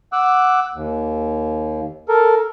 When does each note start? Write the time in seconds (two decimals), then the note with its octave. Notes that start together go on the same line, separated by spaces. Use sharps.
0.13 F#5 D6 E6 F#6
0.74 D#2
2.09 A4 A#4